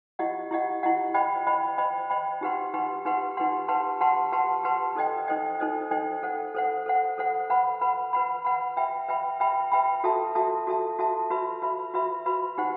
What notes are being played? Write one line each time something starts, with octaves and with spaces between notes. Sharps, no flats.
E4 G4 D#5 F#5
E4 G4 D#5 F#5
E4 G4 D#5 F#5
C5 D#5 G5 B5
C5 D#5 G5 B5
C5 D#5 G5 B5
C5 D#5 G5 B5
D#4 G4 B4 F#5 C6
D#4 G4 B4 F#5 C6
D#4 G4 B4 F#5 C6
D#4 G4 B4 F#5 C6
G4 B4 F#5 A5 C6
G4 B4 F#5 A5 C6
G4 B4 F#5 A5 C6
G4 B4 F#5 A5 C6
D#4 A4 C5 D#5 G5
D#4 A4 C5 D#5 G5
D#4 A4 C5 D#5 G5
D#4 A4 C5 D#5 G5
A4 C5 F#5
A4 C5 F#5
A4 C5 F#5
A4 C5 F#5
B4 F#5 B5
B4 F#5 B5
B4 F#5 B5
B4 F#5 B5
B4 E5 G5 B5
B4 E5 G5 B5
B4 E5 G5 B5
B4 E5 G5 B5
F#4 A4 E5 A5
F#4 A4 E5 A5
F#4 A4 E5 A5
F#4 A4 E5 A5
F#4 B4 E5 B5
F#4 B4 E5 B5
F#4 B4 E5 B5
F#4 B4 E5 B5
D#4 G4 C5 F#5